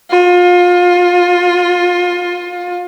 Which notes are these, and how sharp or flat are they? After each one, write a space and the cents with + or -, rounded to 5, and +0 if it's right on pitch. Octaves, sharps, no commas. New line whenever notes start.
F4 +25